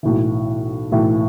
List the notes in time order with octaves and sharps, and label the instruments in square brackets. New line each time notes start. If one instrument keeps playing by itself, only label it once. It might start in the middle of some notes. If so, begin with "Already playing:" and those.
[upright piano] B1 A2 E3
B1 A2 E3